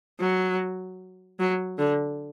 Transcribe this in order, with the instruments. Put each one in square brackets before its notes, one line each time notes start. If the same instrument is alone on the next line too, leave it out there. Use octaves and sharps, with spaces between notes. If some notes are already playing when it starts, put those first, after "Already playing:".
[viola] F#3
F#3
D3